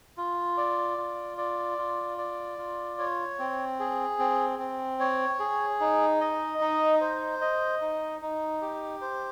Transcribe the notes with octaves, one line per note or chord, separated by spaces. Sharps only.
F4
D5
F4
D5
F4
D5
F4
C#5
C4
G#4
C4
C4
C#5
G#4
D#4
D#5
D#4
C5
D#5
D#4
D#4
G4
C5